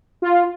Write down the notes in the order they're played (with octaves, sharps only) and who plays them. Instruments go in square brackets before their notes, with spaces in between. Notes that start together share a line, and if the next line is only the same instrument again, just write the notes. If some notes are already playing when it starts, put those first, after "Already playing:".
[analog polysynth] F4